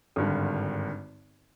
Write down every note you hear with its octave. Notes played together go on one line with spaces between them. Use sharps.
G#1 G2 D3